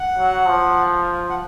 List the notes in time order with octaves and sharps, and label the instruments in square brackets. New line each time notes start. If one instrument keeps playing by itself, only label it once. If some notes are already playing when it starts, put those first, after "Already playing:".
Already playing: [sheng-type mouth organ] F#5
[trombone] F#3
F3
[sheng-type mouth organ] F#5